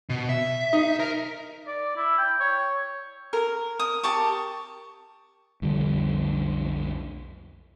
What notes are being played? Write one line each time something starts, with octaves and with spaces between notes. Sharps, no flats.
B2
E5
D#4
A#4 A#5
D5
E4
G5
C#5
A#4
D#6
G4 A5 C#6
B1 F2 D3 G3